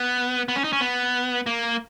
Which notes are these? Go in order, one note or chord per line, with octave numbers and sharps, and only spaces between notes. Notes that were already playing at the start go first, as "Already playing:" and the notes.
Already playing: B3
B3
C#4
D#4
C#4
B3
A#3